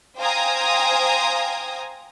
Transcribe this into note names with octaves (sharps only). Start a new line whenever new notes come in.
C5 F5 G5 G#5 A#5 D#6